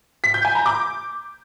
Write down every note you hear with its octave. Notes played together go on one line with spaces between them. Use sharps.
B6
G6
G#5
A#5
D6